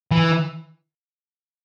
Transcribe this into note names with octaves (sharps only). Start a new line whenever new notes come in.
E3